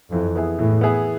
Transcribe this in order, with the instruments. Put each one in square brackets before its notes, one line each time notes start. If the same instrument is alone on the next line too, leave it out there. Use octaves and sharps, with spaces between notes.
[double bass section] F2 [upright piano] E3
[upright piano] B3 E4 G#4
[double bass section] A2 [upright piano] E3
[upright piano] B3 E4 G#4